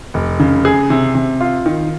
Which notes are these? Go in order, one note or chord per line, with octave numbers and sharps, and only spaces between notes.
F1
C#3
G#4
C3
C3
F4
D#3